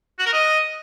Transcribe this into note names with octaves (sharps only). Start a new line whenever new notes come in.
F#4
A#4
D#5